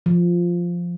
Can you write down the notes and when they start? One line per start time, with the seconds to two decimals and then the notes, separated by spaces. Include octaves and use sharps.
0.06 F3